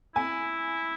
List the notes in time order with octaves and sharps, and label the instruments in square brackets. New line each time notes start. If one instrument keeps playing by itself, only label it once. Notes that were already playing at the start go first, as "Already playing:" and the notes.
[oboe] E4 [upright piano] G#5